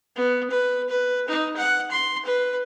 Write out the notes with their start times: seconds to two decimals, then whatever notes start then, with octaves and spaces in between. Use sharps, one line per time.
0.16 B3
0.50 B4
0.89 B4
1.28 D#4
1.57 F#5
1.91 C6
2.25 B4